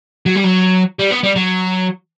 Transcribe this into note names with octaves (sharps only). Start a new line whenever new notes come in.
F#3
G3
F#3
G3
B3
G3
F#3